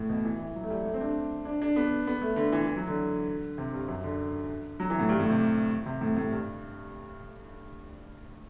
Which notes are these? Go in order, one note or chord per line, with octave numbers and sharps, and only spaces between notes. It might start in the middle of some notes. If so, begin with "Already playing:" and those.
Already playing: A2
B2
E3
E3
F#3
A3
G3
A3
C4
D4
D4
D4
B3
B3
A3
D3
E3
E3
F#3
D3
C3
G2
F#2
D3
F#3
E3
A2
G2
A2
C3
C3
A2
A2
G2